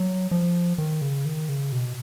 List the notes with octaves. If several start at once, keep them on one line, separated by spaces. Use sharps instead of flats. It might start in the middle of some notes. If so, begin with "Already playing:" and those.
Already playing: F#3
F3
D#3
C#3
D#3
C#3
B2